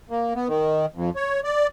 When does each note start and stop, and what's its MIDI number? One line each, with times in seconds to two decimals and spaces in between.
0.10 0.34 58
0.35 0.48 59
0.48 0.86 51
0.95 1.10 41
1.16 1.40 73
1.44 1.67 74